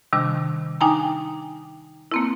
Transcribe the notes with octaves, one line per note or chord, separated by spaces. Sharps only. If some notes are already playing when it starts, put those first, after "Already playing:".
C3 D#3 G3 D4
D4 D#4 G5 G#5 A#5
A#3 C4 E4